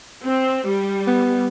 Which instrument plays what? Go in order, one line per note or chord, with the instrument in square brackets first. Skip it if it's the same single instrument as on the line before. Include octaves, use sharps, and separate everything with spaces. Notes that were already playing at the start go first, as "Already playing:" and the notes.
[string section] C4
G3
[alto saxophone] B3